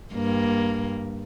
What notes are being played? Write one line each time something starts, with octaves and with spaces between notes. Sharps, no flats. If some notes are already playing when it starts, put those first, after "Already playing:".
G2 A#3